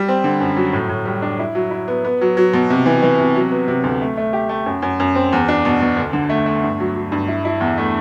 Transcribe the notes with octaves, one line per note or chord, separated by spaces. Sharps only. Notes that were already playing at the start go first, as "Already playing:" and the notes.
Already playing: G3
C4
D3
F#2
F#3
A2
A2
G3
D4
E4
F#3
E4
B3
B3
F#3
F#3
B2
C3
E3
E3
C3
F#3
B3
C3
D2
A3
A3
G4
A3
F#2
F#2
F#2
C4
E2
D4
B2
B2
D2
D3
A3
A3
G2
F#3
F#3
G2
E4
E4
E2
A3